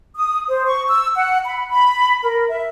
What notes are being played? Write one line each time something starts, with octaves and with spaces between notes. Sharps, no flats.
D#6
C5
C#6
E6
F#5
B5
B5
A#4
E5